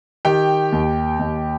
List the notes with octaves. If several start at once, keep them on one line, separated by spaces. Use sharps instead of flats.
D#3 G4 G5
D#2
D#2